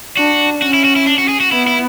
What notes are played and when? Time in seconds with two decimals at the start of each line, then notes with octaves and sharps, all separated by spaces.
0.17 D4 F#4
0.62 C#4 F#4
0.74 E4
0.85 F#4
0.96 E4
1.06 D4
1.18 F#4
1.29 G#4
1.40 F#4
1.52 B3 E4
1.67 E4